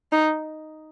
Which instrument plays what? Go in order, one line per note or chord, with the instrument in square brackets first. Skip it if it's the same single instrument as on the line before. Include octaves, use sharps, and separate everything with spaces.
[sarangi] D#4